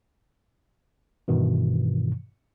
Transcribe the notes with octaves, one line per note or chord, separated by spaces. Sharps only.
G2 B2 D#3 E3